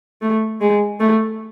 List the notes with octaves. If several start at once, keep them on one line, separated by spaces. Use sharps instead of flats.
A3
G#3
A3